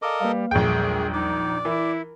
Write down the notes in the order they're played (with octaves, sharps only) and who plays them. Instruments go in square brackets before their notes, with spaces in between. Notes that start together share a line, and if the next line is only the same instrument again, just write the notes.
[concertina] A4 A#4 D#5 [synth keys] D5 F5 D6
[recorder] G3 [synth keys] A#3 B4 F5
[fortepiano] A#1 G5 [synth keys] E2 F#3 G3 [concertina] A3 [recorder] G#4
[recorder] D#4 [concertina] D5
[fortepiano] E3 [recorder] E4 [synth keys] A#4